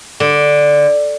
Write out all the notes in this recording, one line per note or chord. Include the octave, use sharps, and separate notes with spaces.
D3